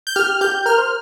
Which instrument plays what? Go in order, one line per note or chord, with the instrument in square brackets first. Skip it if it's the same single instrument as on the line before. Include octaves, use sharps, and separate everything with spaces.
[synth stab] G6
[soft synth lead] G4 [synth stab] F6
[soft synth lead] G4 [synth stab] G6
[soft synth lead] A#4 [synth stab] F6
[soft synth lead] C5